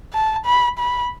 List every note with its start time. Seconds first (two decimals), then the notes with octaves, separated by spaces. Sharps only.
0.13 A5
0.46 B5
0.79 B5